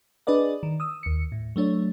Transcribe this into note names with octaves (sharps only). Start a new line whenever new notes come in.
D4 G#4 B4 D5 D#5
D#3
D#6 E6
D#2 C#7
A2
F#3 A3 D4 C#5